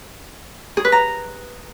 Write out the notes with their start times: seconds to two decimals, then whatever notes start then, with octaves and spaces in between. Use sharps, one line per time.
0.77 G#4
0.85 B4
0.92 A#5